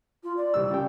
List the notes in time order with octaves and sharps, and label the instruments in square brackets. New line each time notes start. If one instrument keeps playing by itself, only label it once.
[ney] F4
D5
[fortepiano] C2 G3 E6
C#3 G4 G5